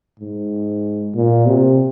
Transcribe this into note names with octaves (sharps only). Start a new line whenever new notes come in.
G#2
A#2
C3